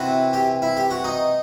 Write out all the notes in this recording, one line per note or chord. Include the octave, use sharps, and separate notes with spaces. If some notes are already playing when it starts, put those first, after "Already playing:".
Already playing: C3 E3 F#4
G4
E4
G4
F#4
D#4